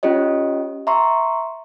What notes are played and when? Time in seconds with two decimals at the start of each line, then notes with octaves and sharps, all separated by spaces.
0.03 C#4 F4 G4 C#5 D#5
0.87 E5 A#5 C6 C#6